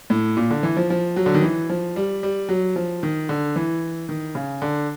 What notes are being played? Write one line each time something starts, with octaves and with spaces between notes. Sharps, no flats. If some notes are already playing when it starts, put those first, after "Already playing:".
A2
A#2
D3
E3
F3
F3
F#3
D3
D#3
E3
F3
G3
G3
F#3
F3
D#3
D3
E3
D#3
C#3
D3